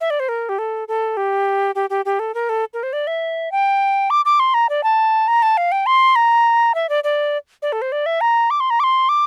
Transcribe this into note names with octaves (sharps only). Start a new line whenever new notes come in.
E5
D5
C5
A#4
G4
A4
A4
G4
G4
G4
G4
A4
A#4
A4
A#4
C5
D5
E5
G5
D6
D6
C6
A#5
D5
A5
A#5
A5
F5
G5
C6
A#5
E5
D5
D5
D5
A4
C5
D5
E5
A#5
D6
C6
A#5
D6
C6
D6